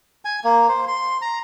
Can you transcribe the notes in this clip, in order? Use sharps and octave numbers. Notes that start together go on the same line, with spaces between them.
G#5
A#3
C5
C6
A#5